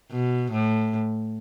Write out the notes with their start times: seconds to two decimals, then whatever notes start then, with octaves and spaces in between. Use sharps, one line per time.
0.11 B2
0.52 A2